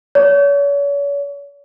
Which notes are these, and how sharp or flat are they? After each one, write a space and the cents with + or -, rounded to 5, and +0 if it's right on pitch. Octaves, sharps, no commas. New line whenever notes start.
C#5 +40